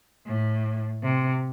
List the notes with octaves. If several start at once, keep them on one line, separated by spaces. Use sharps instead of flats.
A2
C3